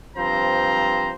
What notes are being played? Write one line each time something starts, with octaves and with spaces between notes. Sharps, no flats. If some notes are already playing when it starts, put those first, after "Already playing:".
G2 F3 C4 C5 A#5